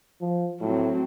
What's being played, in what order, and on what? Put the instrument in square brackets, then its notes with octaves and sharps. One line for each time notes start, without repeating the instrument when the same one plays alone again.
[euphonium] F3
[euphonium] A2 [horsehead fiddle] F#3 C4